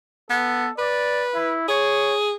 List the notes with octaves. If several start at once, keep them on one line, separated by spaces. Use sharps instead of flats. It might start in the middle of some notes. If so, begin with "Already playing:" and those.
B3 A4
B4 D5
E4
G#4 C#5